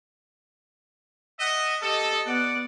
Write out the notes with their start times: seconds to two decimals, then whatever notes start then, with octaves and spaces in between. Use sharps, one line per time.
1.39 D#5 E5 F#5
1.82 G4 A4 D#5
2.27 B3 D5 F#5